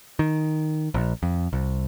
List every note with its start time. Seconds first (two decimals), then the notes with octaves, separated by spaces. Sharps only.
0.19 D#3
0.94 A#1
1.23 F2
1.53 C2